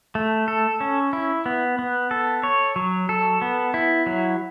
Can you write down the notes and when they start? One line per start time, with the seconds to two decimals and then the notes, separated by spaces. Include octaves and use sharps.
0.15 A3
0.48 A4
0.80 C#4
1.13 E4
1.46 B3
1.79 B3
2.11 A4
2.43 C#5
2.76 F#3
3.09 A4
3.42 B3
3.74 E4
4.06 F#3